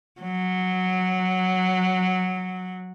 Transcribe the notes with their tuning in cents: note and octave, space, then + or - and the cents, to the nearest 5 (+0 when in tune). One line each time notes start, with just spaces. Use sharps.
F#3 -5